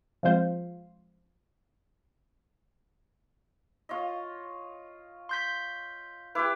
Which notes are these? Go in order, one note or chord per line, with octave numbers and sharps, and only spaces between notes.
F3 G#3 C4 F4 C5
F4 C#5 D#5
C6 G6 B6
E4 G4 B4 D6